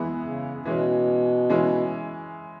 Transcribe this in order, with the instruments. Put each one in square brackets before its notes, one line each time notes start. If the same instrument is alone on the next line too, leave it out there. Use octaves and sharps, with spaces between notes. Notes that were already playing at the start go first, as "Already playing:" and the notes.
Already playing: [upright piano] E3 G#3 B3 E4
[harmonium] C#3
[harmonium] B2 [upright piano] E3 G#3 C#4
[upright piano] E3 G#3 C#4 E4